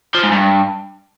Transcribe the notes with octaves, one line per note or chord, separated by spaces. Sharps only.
F3
G#2
G2